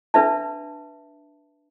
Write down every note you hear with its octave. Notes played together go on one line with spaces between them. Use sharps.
D4 B4 E5 A5